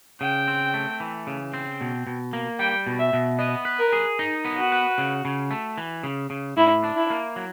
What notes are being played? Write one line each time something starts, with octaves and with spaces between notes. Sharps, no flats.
C#3 G5
C4
A3
E3
C#3
C4
B2
B2
A#3
G3 G5
B2
E5
B2
B3 D#5
B4
A#4
G#4
D#4
B3
F#4
B4
C#3
C#3
A3
E3
C#3
C#3
A2 E4
D4
E4
A#3
F#3